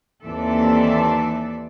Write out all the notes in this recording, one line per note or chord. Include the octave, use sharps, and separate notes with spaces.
D#2 E3 C4 A4 D5 E5